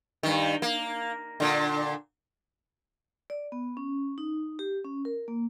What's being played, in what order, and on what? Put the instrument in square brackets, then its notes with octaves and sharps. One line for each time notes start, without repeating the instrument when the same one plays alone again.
[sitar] G2 D#3
A#3
A#2 D3
[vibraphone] D5
B3
C#4
D#4
G4
C#4
A#4
A#3